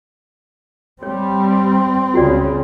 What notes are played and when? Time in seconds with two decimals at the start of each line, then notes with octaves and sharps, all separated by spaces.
1.03 G3 C4 C#5
2.14 C#2 C#3 F4 F#4 D5